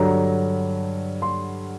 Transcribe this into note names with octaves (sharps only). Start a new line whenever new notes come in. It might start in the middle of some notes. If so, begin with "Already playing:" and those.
Already playing: G2 D3 F#3 A#5
C6